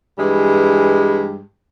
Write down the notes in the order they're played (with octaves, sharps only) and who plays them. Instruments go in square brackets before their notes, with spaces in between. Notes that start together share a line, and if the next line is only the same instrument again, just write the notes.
[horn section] G2 E3 G3 G#3